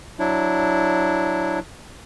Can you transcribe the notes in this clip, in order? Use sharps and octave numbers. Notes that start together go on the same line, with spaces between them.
F#3 D4 E4